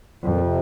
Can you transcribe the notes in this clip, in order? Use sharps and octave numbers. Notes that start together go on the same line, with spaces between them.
F2 A#2
C#3
C3